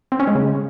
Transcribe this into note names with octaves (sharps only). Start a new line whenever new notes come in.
C4
C#4
G#3
C#3